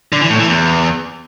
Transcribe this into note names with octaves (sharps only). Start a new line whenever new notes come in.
D3
E3
A2
E3
E2